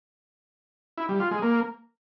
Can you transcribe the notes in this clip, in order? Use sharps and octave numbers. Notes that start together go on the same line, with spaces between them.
E4
G3
F4
G#3
A#3